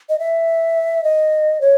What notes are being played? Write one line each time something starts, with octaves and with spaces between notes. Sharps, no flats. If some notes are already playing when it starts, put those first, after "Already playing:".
D#5
E5
D#5
C#5